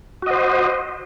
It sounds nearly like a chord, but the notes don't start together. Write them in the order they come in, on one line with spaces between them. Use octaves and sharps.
F#4 D#5 C5